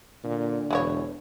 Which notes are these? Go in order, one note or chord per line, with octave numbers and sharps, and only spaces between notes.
A#2 D3
E1 E3 E4 C#5